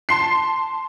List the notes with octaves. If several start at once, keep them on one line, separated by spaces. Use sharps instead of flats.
A5 C6 C7